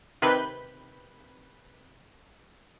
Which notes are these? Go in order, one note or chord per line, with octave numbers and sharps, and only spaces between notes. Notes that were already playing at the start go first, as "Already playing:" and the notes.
C3 D#3 B4 B5 G6 B6